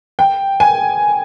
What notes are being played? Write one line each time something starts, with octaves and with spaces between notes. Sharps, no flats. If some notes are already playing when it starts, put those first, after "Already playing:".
G5
G#5